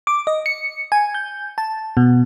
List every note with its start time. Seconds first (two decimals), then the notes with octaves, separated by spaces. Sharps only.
0.07 D6
0.27 D#5
0.46 C#7
0.92 G#5
1.14 G6
1.58 A5
1.97 B2